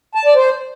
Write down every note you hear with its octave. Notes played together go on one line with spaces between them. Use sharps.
A5
D5
C5